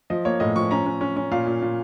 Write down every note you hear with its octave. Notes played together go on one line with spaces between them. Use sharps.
F3 D#5
A#3 C#5
A2 D#5
F3 C#6
C#4 A#5
C#4
C#4
C#4
A#2 F5
A#2
A#2